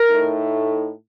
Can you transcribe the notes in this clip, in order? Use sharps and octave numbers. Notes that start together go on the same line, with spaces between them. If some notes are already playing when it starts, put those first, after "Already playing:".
Already playing: A#4
A2 A3 D#4